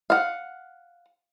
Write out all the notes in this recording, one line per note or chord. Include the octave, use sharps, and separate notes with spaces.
F5 F#5